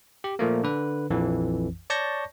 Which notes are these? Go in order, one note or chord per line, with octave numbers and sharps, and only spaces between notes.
G4
A#2 F3 A3 A#3
D3 B4
A#1 F2 E3
C#5 D5 A5 C#6 G6 A#6